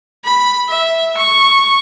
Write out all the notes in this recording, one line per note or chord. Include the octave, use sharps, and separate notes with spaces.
B5
E5
C#6